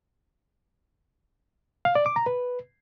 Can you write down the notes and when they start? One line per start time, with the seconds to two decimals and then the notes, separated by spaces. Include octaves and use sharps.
1.85 F5
1.95 D5
2.06 D6
2.16 A#5
2.26 B4